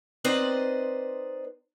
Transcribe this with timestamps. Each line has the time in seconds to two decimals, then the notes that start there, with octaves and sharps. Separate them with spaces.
0.24 C4 D#4 B4 C5 D5 D#5